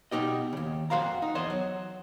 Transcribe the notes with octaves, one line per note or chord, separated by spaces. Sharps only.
B2 D#4 G4 D#5
D#2 C#3
F2 F#4 C5 F5 A#5
D#4
E2 C5 D#5
F#3